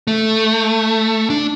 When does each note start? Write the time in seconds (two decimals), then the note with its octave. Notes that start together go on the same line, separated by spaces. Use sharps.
0.07 A3
1.30 D4